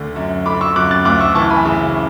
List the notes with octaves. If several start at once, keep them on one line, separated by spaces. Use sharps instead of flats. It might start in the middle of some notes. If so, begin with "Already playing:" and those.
Already playing: D2 D3
F#2
D3 B5 D6
C#6 E6
F#2 D6 F#6
F#6 A6
D2 D6 F#6
C#6 E6
E3 A5 C#6
G#5 B5
C#3